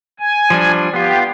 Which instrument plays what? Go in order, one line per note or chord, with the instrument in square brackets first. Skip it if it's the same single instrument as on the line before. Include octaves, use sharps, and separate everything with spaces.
[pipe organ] G#5
[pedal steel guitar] F3 G3 D4
[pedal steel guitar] B3 F4 [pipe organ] G4